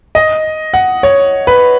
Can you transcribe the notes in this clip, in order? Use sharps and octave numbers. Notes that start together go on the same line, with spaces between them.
D#5
F#5
C#5
B4